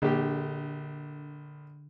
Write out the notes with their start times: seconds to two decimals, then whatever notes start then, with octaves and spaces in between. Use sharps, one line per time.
0.02 A#1 D3 G4